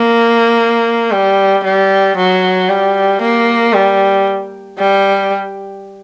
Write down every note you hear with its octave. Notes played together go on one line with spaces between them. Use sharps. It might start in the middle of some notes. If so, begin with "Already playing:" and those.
Already playing: A#3
G3
G3
F#3
G3
A#3
G3
G3